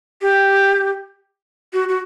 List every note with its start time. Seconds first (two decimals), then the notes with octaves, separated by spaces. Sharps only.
0.21 G4
1.73 F#4
1.89 F#4